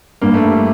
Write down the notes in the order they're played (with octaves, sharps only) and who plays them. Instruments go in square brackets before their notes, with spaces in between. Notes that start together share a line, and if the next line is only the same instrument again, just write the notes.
[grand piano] G2 [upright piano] A#3
[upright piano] A3
G3